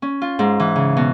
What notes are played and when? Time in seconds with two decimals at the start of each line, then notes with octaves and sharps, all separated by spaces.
0.02 C#4
0.22 F4
0.39 G#2
0.60 E3
0.76 C#3
0.97 B2